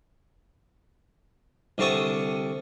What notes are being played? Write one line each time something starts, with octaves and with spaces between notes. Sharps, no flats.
C2 D3 C4 A5 C#6 D#6